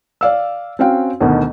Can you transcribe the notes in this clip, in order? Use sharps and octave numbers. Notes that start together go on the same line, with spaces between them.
D5 F5 E6
C4 C#4 F#4 F5 G5
D2 B2 D#3